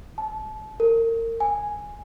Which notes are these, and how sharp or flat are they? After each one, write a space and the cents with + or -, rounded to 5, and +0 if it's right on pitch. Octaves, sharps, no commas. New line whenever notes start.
A5 -30
A#4 -30
G#5 +0